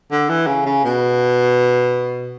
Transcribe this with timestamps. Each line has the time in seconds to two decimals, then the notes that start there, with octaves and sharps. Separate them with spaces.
0.12 D3
0.29 E3
0.47 C#3
0.66 C#3
0.85 B2